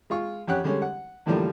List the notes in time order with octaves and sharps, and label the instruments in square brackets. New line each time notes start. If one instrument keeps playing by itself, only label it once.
[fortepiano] G#3 F4 C#6
F2 C#4 G4 F#5 F#6
D3 G3 G#3 C#4
F#5
E2 A2 D3 F3 G3 A#3